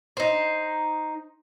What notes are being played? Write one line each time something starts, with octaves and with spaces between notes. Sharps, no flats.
D#4 C5